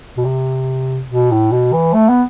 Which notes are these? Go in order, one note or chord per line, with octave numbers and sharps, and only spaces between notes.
B2
C3
B2
A2
B2
E3
A3
B3